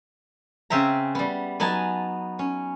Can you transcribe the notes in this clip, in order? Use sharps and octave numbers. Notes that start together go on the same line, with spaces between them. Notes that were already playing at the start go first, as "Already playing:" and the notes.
C#3 C4 E5 G5 A#5
G3 B3
F#3 B3 D#4 G#5 A5
C#4